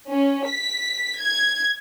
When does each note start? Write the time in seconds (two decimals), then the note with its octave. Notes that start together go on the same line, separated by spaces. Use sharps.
0.10 C#4
0.47 B6
1.20 G#6